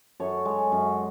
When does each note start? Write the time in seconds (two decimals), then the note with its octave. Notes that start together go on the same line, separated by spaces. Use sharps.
0.20 F#2 A4 C#5
0.45 G#3
0.72 F#2